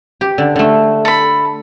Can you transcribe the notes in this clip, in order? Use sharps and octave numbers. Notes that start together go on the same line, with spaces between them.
G4
D3
D3 A3
A4 B5